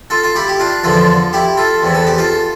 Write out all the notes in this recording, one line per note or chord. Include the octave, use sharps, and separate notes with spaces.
F4 A4
F4
E4 G4
G4
D4 F4
E2 D3 F3 F4 A4
E4 G4
F4 A4
E2 C3 E3
A4
G4
F4 A4